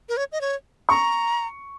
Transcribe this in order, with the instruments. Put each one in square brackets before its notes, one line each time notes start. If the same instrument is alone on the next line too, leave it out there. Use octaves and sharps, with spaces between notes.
[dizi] A#4
C#5
D#5
C#5
[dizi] A#5 [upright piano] C#6